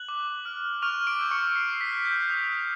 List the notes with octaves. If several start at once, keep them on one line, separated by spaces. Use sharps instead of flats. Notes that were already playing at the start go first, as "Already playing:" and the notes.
Already playing: F#6 F#7
D6
F6
C#6 F6 F7
D6 D7
E6 G6
C#6 C#7
D6 C7
C7
B6
F#6
G6
D#6